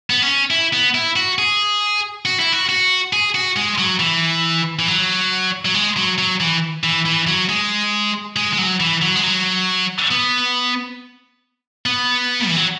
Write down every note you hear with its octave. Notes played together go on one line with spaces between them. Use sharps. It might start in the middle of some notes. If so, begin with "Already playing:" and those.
B3
C#4
E4
B3
E4
F#4
G#4
F#4
E4
F#4
F#4
G#4
F#4
G#3
F#3
E3
E3
F#3
F#3
G#3
F#3
F#3
E3
E3
E3
F#3
G#3
G#3
G#3
F#3
E3
F#3
G#3
F#3
B3
B3
E3
F#3